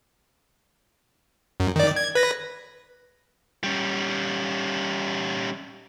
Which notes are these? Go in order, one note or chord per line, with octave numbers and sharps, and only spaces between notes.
F#2
D#3 D5
G#6
B4 A#6
G3 C#4